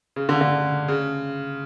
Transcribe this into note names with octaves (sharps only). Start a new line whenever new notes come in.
C#3
D3
D3
C#3